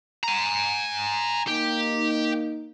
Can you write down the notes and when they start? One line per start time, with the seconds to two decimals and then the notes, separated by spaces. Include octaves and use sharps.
0.23 G#5 A#5
1.48 A#3 D#4 G4